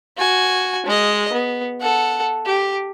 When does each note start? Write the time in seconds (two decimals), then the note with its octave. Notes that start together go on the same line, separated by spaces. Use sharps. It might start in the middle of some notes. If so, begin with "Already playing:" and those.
0.17 F#4 G#5
0.86 G#3 D#5
1.33 B3
1.81 A4 F#5
2.46 G4